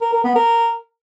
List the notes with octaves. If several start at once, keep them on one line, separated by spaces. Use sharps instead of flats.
A#4
A#4
B3
A#4